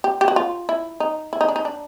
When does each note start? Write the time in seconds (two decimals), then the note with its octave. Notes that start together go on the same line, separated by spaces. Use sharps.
0.04 G4
0.21 G4
0.28 F#4
0.36 F4
0.69 E4
1.00 D#4
1.33 E4
1.41 D#4
1.48 D4
1.56 D#4
1.65 D4